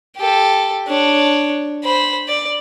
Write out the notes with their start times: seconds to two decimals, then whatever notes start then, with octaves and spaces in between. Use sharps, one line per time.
0.17 G4 A4
0.88 D4 C#5
1.84 C5 B5
2.28 D5